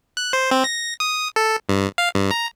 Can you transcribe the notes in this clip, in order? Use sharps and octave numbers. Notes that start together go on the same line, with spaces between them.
F#6
C5
C4
A#6
D#6
A4
G2
F5
G2
A#5